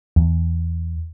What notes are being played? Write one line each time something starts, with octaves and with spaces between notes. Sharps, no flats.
E2